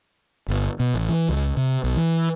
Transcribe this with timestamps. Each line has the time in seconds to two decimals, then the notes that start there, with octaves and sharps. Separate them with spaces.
0.48 G1
0.80 B2
0.94 A1
1.09 E3
1.29 C#2
1.57 C3
1.84 B1
1.97 E3